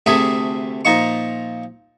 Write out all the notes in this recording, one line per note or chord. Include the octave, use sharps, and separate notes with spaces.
D2 C3 A3 G#4 E5 D#6
A#2 F3 D#4 C#6